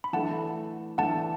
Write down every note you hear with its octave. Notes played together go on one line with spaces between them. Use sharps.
B5
E3 A3 D4 A4 F#5 A5
E3 A3 D4 A4 F#5 A5